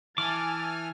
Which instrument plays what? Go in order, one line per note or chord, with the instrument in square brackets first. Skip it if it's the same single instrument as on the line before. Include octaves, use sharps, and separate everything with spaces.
[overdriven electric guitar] E3 [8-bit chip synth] G#5 F6 [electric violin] A5 A6 [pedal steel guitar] D6